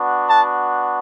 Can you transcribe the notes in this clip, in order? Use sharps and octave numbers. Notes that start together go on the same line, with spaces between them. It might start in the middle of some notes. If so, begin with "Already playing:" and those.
Already playing: B3 D4 F#4
A5